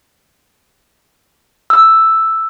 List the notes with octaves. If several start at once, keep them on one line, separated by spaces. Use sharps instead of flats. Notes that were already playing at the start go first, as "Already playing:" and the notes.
E6